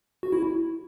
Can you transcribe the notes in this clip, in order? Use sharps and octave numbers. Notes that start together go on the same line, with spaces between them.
F#4
E4